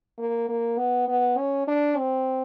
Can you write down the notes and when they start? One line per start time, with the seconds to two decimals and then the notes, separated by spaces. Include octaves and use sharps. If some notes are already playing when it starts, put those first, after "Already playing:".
0.18 A#3
0.49 A#3
0.78 B3
1.08 B3
1.38 C#4
1.68 D4
1.98 C4